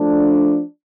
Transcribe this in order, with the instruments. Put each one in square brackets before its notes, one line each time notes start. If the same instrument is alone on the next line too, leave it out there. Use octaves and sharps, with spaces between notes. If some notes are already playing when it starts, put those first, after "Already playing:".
Already playing: [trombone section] F3 A3 D4